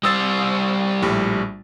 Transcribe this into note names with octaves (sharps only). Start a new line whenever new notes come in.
G3 C5 D#6 E6 A6
A#1 A2 G3